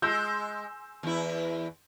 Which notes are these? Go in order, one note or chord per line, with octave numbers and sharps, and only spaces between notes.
G#3 C6 E6 G6
E2 E4